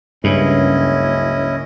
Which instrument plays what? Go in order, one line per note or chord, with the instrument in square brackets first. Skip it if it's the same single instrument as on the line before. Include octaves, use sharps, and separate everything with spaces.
[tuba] F#1 [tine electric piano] C#2 C#3 [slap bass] G2 [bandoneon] C#4 E4 D#5